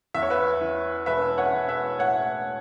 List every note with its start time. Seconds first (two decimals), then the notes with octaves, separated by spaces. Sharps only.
0.14 E2 E5
0.22 C#5
0.30 B4 E5
0.61 E3
1.06 E1 B4 E5
1.38 C#5 F#5
1.54 E1
1.68 B4 E5
1.99 A2 C#5 F#5